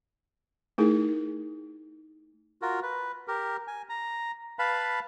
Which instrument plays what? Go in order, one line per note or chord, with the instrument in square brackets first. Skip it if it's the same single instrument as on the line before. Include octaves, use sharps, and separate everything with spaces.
[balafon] A3 D#4 E4 G#4 A#4
[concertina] F4 F#4 A#4
B4
G4 A#4
G#5
A#5
B4 F5 A5 B5